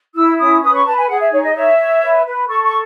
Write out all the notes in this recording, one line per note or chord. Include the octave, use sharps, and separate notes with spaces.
E4 E6
C#4 D#6
B4 D#6
C#6
B4 A5
G#5
G#4 F#5
E5
D#4 C#5
D#5
C#5 E5
C#5
B4
B4
A4 C#6
C#6